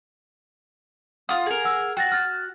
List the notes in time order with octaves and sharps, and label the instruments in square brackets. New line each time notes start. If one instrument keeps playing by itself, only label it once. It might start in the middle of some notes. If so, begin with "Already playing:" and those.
[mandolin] F4 D#6 [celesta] F#5
[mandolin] G#4 A#4
[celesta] F#5 E6
[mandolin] F#4 [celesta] G5 A6 A#6
[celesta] F6 A6